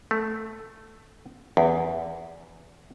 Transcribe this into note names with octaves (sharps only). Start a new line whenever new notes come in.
A3
E2